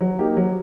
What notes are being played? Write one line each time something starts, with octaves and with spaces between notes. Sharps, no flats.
F#3
A#3 D#4 G4
F#3